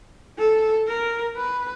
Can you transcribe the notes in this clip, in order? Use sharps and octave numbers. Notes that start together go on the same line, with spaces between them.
A4
A#4
B4